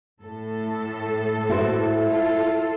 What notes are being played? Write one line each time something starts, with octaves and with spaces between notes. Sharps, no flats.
A2 A4
E4 F#4 C5
F4 A4